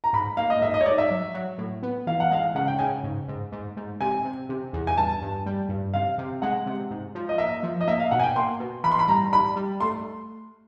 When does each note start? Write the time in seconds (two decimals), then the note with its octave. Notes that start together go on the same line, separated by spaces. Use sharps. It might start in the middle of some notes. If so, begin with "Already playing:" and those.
0.04 A#5
0.13 G#2 B5
0.37 A#3 F5
0.50 D#5
0.62 G#2 E5
0.74 D#5
0.81 C#5
0.86 G#2 D5
0.98 E5
1.11 F#3
1.34 F#3
1.58 A2
1.83 B3
2.07 E3 F5
2.20 F#5
2.31 G#3 F5
2.55 C#3 F#5
2.68 G5
2.79 C#3 G#5
3.04 G#2
3.28 G#2
3.52 G#2
3.77 G#2
4.01 C3 G#5
4.25 C3
4.49 C3
4.73 E2
4.87 G#5
4.97 G2 A5
5.22 G2
5.46 G3
5.69 G2
5.94 C3 F5
6.18 C3
6.42 G#3 F#5
6.66 C3
6.90 G#2
7.15 F3
7.29 D#5
7.38 A#3 E5
7.63 F3
7.81 D#5
7.87 A#3 E5
8.00 F5
8.11 B2 F#5
8.20 G#5
8.23 G5
8.35 A#3 C6
8.60 B2
8.84 E3 B5
8.92 C6
8.99 B5
9.08 G3 A#5
9.32 G3 B5
9.56 G3
9.80 A3 C6